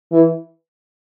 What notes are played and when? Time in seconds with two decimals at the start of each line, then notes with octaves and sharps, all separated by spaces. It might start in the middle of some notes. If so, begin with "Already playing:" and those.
0.12 E3